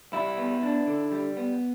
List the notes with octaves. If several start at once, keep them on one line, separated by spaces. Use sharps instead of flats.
G3 E4
B3
D4
D3
G3
B3